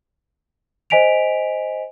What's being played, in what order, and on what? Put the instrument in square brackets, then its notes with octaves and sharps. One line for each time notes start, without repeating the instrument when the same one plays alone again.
[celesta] C5 D#5 G#5 B6 D7 F7